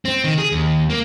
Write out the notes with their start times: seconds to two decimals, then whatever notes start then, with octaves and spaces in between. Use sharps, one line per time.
0.05 C4
0.24 D#3
0.38 G#4
0.52 D#2
0.90 A#3